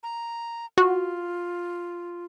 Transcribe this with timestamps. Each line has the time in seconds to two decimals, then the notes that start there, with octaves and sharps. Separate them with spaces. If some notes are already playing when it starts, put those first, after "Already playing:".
0.03 A#5
0.78 F4 F#4